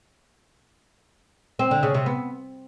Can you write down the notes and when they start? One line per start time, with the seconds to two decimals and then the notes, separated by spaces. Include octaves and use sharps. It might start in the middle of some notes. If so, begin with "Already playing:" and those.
1.59 C4
1.71 D3
1.83 C#3
1.94 C3
2.06 B3